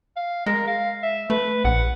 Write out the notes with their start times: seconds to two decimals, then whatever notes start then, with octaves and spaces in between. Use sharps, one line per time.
0.16 F5
0.46 G#3 A#4
0.67 F5
1.03 E5
1.30 A3 B4
1.64 A#1 F#5